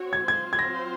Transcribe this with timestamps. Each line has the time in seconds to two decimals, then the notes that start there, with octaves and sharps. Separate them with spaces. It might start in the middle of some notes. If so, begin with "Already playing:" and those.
Already playing: C4 F#4 C#5
0.13 G#6
0.27 F#3 C4 F4 C5 G#6
0.53 G#6
0.59 A#6